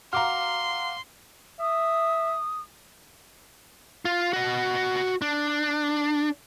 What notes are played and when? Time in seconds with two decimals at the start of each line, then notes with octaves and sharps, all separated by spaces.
0.13 F#4 F5 A#5 C6 D6 F6
1.61 E5 D#6
4.05 F4
4.33 F#4 D#5
5.22 D4